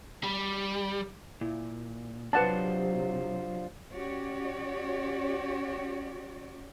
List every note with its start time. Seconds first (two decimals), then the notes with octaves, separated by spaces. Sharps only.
0.24 G3
1.41 A#2 E4
2.33 C3 F#3 D4 F4 B4 C5 F#5 A5
3.94 C#4 F#4 G4 C#5 D5